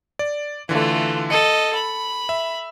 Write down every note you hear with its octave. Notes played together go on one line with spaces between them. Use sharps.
D5
D3 E3 A3 F4
A4 D#5 C#7
B5
E5